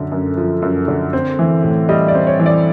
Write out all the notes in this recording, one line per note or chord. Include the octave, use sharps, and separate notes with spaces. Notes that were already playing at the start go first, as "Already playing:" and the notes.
Already playing: F#2 D3
F#2
F3
F#2
D3
C4
E3
A2
G3 D#5
D5
C4
C#5
E3
D5